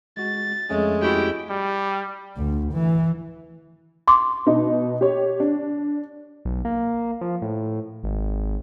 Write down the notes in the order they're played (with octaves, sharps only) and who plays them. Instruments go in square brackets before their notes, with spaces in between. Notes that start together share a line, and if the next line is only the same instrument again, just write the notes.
[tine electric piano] G#3 F#4 [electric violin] A6
[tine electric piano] F2 A3 C#4 [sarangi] G#3
[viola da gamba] E4 F#4 G4 [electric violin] G5
[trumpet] G3
[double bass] D2
E3
[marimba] C6 D6
[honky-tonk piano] B2 D#4 D#5
G4 C#5
D4
[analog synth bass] B1
A#3
F3
A2
G#1